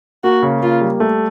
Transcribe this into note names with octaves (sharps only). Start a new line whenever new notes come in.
A#3 F#4
C#3
A#3 F4
G3
A3